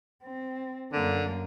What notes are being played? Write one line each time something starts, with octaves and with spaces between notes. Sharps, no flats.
C4
F#2 D3 A#3